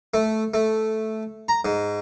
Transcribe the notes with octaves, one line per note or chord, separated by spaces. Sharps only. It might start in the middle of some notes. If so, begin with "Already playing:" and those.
A3
A3
A#5
G#2